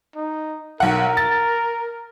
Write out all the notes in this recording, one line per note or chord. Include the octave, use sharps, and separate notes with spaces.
D#4
B1 A#4 F#5
A6